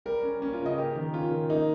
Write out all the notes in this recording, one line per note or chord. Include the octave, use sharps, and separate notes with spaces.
G3 A#4
C#4
A#3 C#4
F4
C#3
D#5
A#3 G4
D#3
C#4 F4
D#3
A#3 D#4